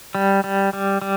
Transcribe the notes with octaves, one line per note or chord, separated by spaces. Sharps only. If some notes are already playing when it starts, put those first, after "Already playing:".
G3
G3
G3
G3